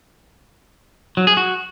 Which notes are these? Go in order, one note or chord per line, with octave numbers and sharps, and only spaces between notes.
F#3
G#4
F#4